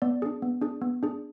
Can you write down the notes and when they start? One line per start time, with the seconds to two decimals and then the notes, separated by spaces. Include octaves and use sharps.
0.02 B3 D5
0.22 D4 G#4
0.42 B3
0.61 D4 G#4
0.82 B3
1.03 D4 G#4